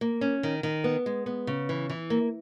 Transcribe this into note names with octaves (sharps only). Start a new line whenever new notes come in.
A#3
C#4
D#3
D#3
B3
G#3
B3
C#3
E3
E3
A#3